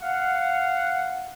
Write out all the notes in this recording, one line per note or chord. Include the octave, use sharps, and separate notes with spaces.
F5 F#5